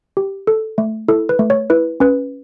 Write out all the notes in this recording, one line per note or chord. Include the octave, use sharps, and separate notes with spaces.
G4
A4
A3
E4 A4
B4
A3
C#5
E4 B4
C#4 B4